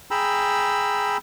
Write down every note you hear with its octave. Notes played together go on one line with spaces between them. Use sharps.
G#4 G5 A#5 B5 E6